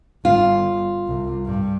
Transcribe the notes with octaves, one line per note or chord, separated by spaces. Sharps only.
G1 F4
C2
G2